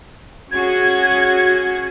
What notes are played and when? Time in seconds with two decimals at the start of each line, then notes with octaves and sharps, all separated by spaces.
0.51 C#4 F#4 G#4 G#6